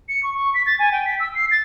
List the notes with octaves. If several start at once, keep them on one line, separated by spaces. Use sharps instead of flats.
C#7
C#6
C#6
B6
A6
G#5
G5
B6
E6
C7
A6